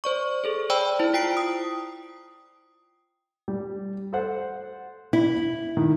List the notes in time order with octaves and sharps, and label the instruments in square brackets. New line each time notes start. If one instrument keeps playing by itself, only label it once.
[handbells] C5 D5 C#6
G#4 A4 C5
C5 D5 G5 B5 E6
E4 C5 A5
F4 G5 C7 D7
D#6
[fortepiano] G3
A4 C5 F#5
[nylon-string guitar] E4
[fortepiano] D#3